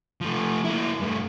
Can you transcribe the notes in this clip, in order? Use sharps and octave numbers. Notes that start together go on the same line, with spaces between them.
F3 A3
A#3 E4
G2 A3